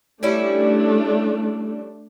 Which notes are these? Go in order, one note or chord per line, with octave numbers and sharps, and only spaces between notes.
G3 A3 C#4 D4 E4